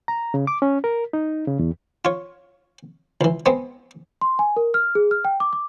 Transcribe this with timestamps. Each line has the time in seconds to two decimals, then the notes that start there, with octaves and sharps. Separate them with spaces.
0.08 A#5
0.34 C#3
0.47 D6
0.62 C#4
0.84 A#4
1.13 D#4
1.47 C#3
1.59 E2
2.05 F4 C#5
3.21 C#2 E3
3.46 G#3 B3 C4
4.21 C6
4.39 G#5
4.56 A#4
4.74 F6
4.95 G#4
5.11 F6
5.25 G5
5.40 D6
5.53 D6